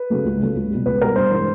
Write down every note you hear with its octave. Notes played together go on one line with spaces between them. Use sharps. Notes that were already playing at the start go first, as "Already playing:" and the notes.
Already playing: B4
C#3 F#3 A3
C#2
C#3 F#3 A3
C#2
B2 G3
C#2 B4
B2 G3 A#4
G2 C5
E3 G#3